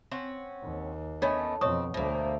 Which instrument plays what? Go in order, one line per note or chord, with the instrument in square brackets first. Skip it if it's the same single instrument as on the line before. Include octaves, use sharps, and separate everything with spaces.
[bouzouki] C4 C#4 F#5
[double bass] D#2
[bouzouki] A3 B3 C#4 [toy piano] D4 C#5 [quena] D#5
[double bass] F2 B2 [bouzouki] C4 [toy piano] C#5 C#6 D#6 [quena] D#5
[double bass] D2 A3 [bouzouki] B2 A#3 [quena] C5